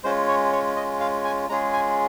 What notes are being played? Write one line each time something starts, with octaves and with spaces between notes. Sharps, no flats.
G#3 C#4 F4 C5
C#5
C#5
D#5
F5
G#5
G#3 C#4 F4 G#4 A#5
G#5